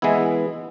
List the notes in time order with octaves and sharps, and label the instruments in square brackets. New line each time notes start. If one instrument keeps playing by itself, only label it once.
[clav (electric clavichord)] E3 G#3 B3 E4